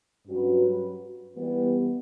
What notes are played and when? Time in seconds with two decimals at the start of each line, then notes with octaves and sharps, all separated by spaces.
0.26 G2 F#3 C#4 F#4 B4
1.34 E3 G3 B3